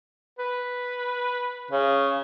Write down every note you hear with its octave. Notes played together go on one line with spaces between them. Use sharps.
B4
C#3